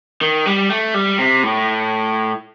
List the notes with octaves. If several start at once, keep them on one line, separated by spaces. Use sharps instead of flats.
D#3
G3
A3
G3
C3
A2